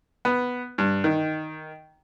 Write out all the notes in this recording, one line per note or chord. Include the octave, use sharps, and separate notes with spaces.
B3
G2
D#3